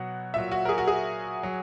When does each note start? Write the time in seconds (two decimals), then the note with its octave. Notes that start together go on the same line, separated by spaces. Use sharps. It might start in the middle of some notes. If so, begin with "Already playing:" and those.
Already playing: B2 F#3 F#5
0.34 A#2 F#3 E5
0.52 F#4
0.65 A#4
0.69 G#4
0.78 F#4
0.88 G#4
1.43 F#3